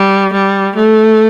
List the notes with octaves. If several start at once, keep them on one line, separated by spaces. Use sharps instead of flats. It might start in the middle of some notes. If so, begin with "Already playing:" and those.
Already playing: G3
G3
A3